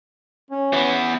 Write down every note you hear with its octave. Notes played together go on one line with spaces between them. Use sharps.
C#4
E3 B3